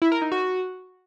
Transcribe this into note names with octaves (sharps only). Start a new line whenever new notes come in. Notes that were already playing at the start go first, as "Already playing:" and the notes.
E4
A#4
D#4
F#4